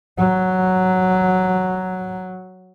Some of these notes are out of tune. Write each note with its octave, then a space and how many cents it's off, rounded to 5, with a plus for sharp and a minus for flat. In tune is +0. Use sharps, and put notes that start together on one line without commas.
F#3 +0